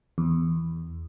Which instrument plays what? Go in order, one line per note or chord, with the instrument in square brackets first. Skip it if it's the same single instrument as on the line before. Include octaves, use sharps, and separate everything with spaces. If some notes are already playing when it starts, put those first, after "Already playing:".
[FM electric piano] E2